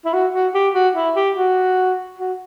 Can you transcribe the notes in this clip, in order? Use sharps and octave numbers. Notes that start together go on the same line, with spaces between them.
E4
F#4
F#4
G4
F#4
E4
G4
F#4
F#4